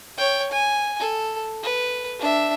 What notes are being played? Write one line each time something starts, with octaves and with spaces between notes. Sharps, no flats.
C#5 G5
G#5
A4
B4
D4 E5